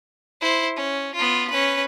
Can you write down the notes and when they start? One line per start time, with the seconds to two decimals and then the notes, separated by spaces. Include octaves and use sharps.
0.41 E4 C5
0.76 C#4
1.15 B3 F4
1.50 C#4 B4